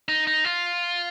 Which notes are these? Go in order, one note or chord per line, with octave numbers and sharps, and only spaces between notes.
D#4
D#4
F4